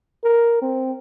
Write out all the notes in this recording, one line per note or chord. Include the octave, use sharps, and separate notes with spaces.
A#4
C4